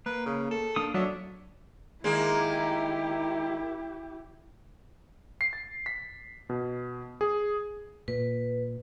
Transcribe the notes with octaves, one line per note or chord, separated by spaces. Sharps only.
A#3 B4
C#3
A4
A#3 D4 D#6
F#3 D4 C#5 D#5 E5
D#3 G#3 A#3 E4 G4
C7
A6
B6
B2
G#4
A#2 B4